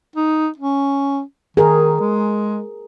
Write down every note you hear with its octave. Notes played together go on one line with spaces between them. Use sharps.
D#4
C#4
D#3 G#4 A#4
G#3